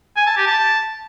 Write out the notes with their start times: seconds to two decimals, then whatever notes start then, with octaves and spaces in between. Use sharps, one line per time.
0.16 G#5
0.27 A5
0.37 G4
0.47 A5